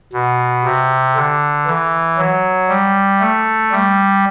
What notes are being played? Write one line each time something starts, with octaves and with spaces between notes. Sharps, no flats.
B2
C3
D3
E3
F#3
G3
A3
G3